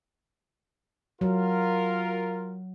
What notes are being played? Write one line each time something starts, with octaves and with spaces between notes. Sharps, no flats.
F#3 F4 A#4